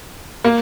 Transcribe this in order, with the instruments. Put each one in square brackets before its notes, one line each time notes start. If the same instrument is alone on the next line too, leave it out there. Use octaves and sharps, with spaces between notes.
[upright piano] A#3